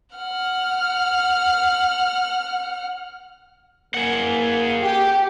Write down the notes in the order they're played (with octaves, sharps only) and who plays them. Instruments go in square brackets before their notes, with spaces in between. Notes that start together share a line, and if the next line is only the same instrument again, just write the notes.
[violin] F#5 F6
[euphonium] A#3 [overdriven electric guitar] G#4 F#5
[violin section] G4